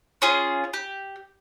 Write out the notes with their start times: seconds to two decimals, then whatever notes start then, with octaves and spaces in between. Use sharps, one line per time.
0.22 C#4 F4 G#4
0.74 G4